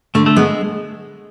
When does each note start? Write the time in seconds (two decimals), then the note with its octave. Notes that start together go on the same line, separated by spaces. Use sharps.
0.15 D3 A3
0.26 A3
0.37 G#3 B3